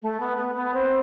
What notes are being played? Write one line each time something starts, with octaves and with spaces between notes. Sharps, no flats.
A3
B3
B3
B3
C4